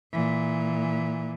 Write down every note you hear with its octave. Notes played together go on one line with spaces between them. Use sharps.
A#2 E3